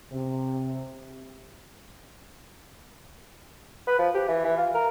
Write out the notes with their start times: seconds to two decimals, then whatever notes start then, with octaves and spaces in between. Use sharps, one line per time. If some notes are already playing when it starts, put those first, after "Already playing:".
0.12 C3
3.87 B4
3.99 F3
4.14 G4
4.28 E3
4.45 E3
4.58 F4
4.74 A#4